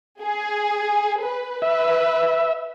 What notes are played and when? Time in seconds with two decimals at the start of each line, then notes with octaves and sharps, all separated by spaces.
0.22 G#4
1.22 B4
1.62 B4 E5